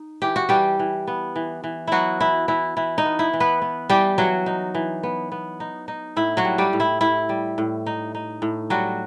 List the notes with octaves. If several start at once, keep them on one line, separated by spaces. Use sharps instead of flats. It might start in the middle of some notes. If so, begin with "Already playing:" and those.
Already playing: D#4
E3 G4
F#4
E3 G3 G4
E3
B3
E3
E3
F#3 B3 E4 F#4
E3 E4
E3 E4
E3 E4
D#4
B3
E4
E3
B3 B4
B3
E3 G3 G4
E3 F#3 F#4
D#4
E3
B3
B3
D#4
D#4
A2 E4
F#3 F#4
G3
G3 G4
A2
E4
A2 E4
G3
A2
D#4
D#4
A2
F#3 G3 F#4